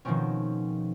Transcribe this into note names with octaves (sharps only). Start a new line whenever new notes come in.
B2 D#3 F3 G#3 C4 C#4